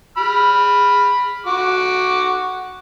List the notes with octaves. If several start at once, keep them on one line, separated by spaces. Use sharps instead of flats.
B5 F6
F#4 D6